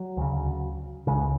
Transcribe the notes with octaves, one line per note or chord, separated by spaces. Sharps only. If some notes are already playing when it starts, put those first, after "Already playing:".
Already playing: F#3
D2 C#3
C#2 C#3 G#3